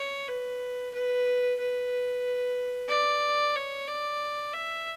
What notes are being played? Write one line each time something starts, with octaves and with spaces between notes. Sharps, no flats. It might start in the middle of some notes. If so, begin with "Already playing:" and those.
Already playing: C#5
B4
B4
B4
D5
C#5
D5
E5